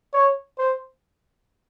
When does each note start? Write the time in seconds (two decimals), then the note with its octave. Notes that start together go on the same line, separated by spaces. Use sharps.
0.14 C#5
0.58 C5